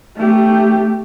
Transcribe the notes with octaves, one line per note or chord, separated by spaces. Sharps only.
A3 G4